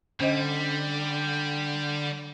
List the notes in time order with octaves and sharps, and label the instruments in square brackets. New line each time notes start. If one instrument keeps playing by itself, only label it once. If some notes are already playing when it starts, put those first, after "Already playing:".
[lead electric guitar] D3 [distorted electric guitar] G3 [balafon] C#4 C5 D#5